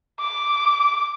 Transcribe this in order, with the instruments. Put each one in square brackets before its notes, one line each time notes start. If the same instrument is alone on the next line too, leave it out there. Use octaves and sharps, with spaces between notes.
[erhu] D6